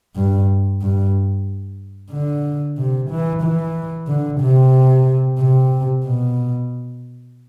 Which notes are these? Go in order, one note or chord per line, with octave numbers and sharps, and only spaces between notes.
G2
G2
D3
C3
E3
E3
D3
C3
C3
B2